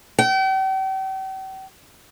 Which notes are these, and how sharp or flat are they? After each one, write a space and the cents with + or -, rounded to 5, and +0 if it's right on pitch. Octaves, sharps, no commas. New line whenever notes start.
G5 -40